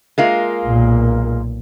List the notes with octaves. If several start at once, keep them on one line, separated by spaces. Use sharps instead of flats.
G#3 A#3 F4
B1 A#2